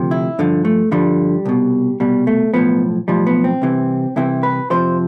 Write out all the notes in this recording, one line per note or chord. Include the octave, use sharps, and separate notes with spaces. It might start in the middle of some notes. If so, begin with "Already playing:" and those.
Already playing: D2 C3 F3
E4
G2 D3 F3
A3
G2 D3 F3 G3
C2 B2
C2 B2 G3
A3
B1 A2 F3 B3
B1 A2 F3 G3
B3
C4
C2 C3 E3
C2 C3 E3 E4
B4
F2 C3 F3 C5